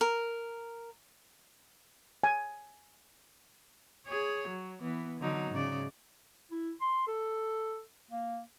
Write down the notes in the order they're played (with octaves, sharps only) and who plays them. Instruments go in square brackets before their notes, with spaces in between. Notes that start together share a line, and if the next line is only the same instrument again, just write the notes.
[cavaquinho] A#4
[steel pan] G#5
[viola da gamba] G#4 C#5
F#3
E3 B3
D3 F#3 D#4
G#2 C#3 D5
[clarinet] E4
C6
A4
A#3